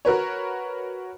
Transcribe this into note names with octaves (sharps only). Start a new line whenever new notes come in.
F#4 A#4 B4 C#5